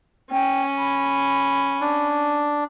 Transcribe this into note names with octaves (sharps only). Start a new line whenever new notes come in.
C#4 G5
B5
D4